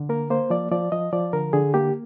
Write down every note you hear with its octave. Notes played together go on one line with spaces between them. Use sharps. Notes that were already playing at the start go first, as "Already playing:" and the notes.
Already playing: D3
A#3 A#4
A#3 C5
F3 D5
F3 D5
F3 D#5
F3 D5
D3 A#4
D3 G#4
A#3 G4